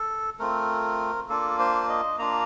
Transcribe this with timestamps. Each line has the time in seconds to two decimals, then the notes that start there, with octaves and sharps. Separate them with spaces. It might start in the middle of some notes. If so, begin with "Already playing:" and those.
Already playing: A4
0.39 A3 C4 F4 A#4
1.29 A#3 D4 F4 A4
1.59 C5
1.89 D#5
2.19 A#3 D4 F4 A#5